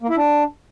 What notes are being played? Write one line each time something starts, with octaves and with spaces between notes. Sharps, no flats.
A#3
E4
D4